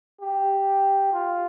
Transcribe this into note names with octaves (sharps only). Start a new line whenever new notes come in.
G4
F4